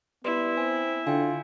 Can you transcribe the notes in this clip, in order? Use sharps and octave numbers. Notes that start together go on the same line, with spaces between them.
G3 B3 E4 B4 C6
C4 G#5
D3 F4 G5 G#5